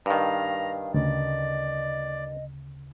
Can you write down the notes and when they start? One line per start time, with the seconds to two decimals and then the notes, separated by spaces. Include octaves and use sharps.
0.06 G2 D#3 F5 A#5
0.94 D2 C#3 D5 D#5